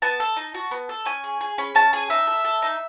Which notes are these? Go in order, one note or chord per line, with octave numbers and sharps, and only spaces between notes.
B3 A5
A4
D#4
F#4
B3
A4
C#4 G#5
G#4
G#4
C#4 B5
C#4 A5
G#4 G#5
D#4 E5
A4
A4
D#4